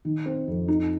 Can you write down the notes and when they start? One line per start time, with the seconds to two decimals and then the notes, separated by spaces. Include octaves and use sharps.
0.05 D#3
0.26 C4
0.48 F2
0.68 D#4